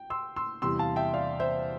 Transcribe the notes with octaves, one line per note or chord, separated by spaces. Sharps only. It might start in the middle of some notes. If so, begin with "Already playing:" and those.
Already playing: G5
C6 E6
C6 E6
E2 C3 G3 C6 E6
F5 A5
E5 G5
D5 F5
C5 E5